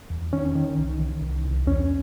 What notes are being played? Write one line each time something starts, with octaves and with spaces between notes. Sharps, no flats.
E2
D#3 C#4
D#3
C2
D#3
C2
C2
E2 C#4